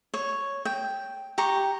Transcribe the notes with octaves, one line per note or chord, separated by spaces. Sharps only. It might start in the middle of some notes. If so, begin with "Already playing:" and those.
C#5
G5
G4 A#5 C#6